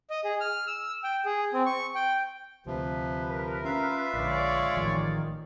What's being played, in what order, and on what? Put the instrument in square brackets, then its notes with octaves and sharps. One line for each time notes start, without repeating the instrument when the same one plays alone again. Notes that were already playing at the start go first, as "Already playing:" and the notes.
[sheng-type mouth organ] D#5
G#4
F6
E6
G5
G#4
C4
C#6
G5
[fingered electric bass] D2 [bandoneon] C3 F3 [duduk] B4
[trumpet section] A#4
[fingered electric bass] C#4 [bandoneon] F4 E5 F5
[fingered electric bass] A#1 D3 [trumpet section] G#3 C#5 D5
[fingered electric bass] A1 F3 [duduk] D#3